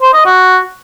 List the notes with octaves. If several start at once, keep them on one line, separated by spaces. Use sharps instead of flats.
C5
D#5
F#4